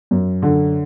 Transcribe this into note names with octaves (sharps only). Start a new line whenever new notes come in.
F#2
D3